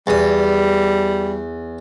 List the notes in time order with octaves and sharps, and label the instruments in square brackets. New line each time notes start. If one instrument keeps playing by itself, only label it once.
[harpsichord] E2 D#6 [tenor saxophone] G3